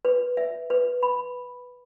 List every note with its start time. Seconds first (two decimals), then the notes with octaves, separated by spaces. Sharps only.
0.05 B4
0.37 E5
0.70 B4
1.03 B5